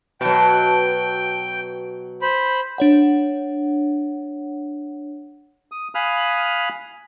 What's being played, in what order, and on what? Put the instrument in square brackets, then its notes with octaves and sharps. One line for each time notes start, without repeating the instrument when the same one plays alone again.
[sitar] B2 F#3 [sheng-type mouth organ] G5
[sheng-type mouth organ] C5 B5
[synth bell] D4 C#5 F#5
[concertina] D#6
F5 G#5 B5 D#6 F6 F#6